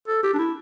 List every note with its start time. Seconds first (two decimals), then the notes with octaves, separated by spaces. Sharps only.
0.08 A4
0.23 G4
0.34 D4
0.39 E4